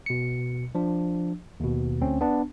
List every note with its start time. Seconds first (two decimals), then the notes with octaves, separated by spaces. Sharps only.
0.06 B2 C#7
0.75 F3 D4
1.60 D#2 B2
2.01 D2 C4 C#4
2.21 B3 D4